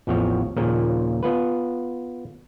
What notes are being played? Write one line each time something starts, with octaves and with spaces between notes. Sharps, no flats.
A1 E2 F3 C4 C#5
D#2 A#2 C#3 F3 A#3
B3 F4 B4